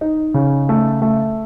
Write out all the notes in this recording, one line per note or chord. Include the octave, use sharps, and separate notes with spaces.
D#4
C#3
A3
A3